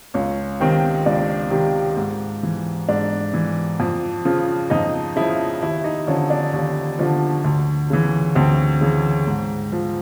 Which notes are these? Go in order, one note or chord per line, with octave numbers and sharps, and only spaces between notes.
C#2 C#4
C3 D#3 C4
C#2 D4
C3 D#3
G#2
E3
G#2 D4
E3
F2
C#3 F3
F2 D#4
C#3 F3 E4
D#2 E4
D#4
D3 F3 C#4
D4
D#2
D3 F3
D2
C#3 E3
D2 C4
C#3 E3
G#2
F3